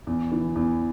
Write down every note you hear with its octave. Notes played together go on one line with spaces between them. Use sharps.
E2
E3
E2